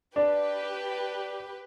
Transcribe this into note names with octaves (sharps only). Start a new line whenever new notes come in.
D4 G4 B4